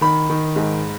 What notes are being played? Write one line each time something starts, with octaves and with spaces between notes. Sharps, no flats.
D#3 B5
D#3
G#2